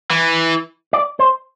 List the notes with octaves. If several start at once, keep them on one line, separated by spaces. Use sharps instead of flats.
E3
D5
C5